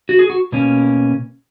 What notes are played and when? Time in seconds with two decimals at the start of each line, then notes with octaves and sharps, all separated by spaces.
0.09 F#4
0.19 G#4
0.30 F#4
0.52 B2 A#3 C#4